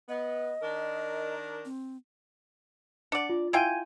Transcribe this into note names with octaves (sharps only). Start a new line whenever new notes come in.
B3 D#5
D#3 D4 A#4
C4
D4 D5 F#5 D6 C#7
F4
E4 F4 G5 G#5 G#6 D#7